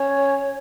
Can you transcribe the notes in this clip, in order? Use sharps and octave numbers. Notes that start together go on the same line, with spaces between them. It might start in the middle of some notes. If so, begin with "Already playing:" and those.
Already playing: C#4 C#5